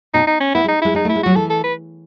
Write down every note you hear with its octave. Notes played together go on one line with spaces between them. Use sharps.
B2 D#4
D#4
C#4
B3 E4
G#3
D#4
G#3 E4
G#3 D#4
A3
E4
G#3
F#3 F#4
E3 A4
A4
B4